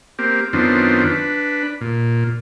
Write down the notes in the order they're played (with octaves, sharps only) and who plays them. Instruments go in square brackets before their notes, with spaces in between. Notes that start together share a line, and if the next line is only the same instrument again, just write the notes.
[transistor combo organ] A#3 C4 G4
F#2 D#3 B3 C4 D4 F4
D4 B4
A#2